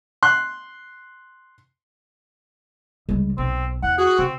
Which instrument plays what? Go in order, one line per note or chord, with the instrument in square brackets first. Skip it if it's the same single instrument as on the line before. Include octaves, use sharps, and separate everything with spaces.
[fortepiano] C6 F#6
[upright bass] C#2 G3
[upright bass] B1 [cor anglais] C4
[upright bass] E2 [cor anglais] F#5
[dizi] F#4 [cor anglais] G#4
[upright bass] C#3 [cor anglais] C4